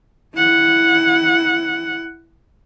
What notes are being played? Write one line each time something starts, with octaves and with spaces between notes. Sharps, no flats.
E4 F#5